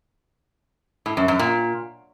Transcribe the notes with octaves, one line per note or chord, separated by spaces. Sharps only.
A2
F#2
F#2
A#2